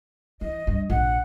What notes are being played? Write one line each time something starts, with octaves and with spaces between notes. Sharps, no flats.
E3 D#5
G2
A#1 F#5